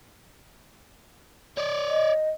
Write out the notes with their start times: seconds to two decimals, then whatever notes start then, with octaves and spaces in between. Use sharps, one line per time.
1.58 C#5 D5
1.88 D#5